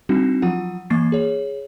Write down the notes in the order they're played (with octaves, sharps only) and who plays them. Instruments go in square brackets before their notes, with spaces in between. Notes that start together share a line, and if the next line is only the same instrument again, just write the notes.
[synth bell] G3 C4 D4 D#4 F#4
F3 F#3 F4 F#5
E3 A#3 C#6 A6 C7
G#4 C#5